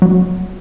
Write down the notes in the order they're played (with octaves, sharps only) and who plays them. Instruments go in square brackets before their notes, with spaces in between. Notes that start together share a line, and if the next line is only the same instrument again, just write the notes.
[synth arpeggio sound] F#3